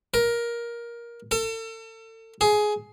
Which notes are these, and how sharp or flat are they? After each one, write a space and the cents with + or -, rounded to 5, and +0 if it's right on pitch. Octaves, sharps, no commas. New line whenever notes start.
A#4 +15
A4 +35
G#4 +15